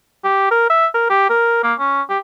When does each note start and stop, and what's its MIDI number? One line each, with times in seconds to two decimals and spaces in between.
0.24 0.46 67
0.51 0.66 70
0.70 0.87 76
0.94 1.06 70
1.10 1.29 67
1.30 1.62 70
1.63 1.74 58
1.79 2.02 61
2.10 2.18 67